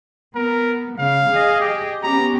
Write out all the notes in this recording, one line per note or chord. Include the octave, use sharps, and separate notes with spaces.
B3 A#4
C#3 F5
G#4 D#5
G4
B3 C#4 G4 A#5